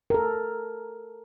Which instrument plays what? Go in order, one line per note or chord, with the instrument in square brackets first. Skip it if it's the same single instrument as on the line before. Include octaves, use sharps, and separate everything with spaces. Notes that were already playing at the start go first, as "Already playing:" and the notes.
[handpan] A4 A#4